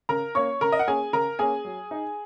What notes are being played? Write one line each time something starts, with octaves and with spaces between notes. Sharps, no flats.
C#3 A#4 A#5
A#3 C#4 C#5 C#6
C#3 A#4 A#5
D#5
F#5
A#3 C#4 G#4 G#5
C#3 A#4 A#5
A#3 C#4 G#4 G#5
F#3
D#4